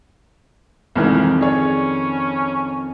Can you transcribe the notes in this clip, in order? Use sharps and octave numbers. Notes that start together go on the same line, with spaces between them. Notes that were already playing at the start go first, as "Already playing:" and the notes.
C2 F2 G#2 D#3 E3
C#4 G#4 C#5 D5